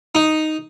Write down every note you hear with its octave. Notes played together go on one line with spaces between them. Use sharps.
D#4